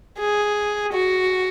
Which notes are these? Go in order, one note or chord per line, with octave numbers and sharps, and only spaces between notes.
G#4
F#4